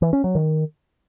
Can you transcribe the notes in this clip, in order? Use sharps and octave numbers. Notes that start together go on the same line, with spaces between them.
E3
C#4
F#3
D#3